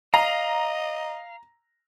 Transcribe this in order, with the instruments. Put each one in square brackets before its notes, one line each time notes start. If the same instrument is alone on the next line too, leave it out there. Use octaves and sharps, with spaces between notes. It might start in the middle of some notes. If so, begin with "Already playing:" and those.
[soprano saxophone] D#5 [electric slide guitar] F5 [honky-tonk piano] A#5